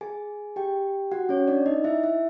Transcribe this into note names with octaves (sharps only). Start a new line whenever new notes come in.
G#4 G#5
G4 G5
F#4 F#5
C#4 C#5
D4 D5
D#4 D#5
E4 E5
E4 E5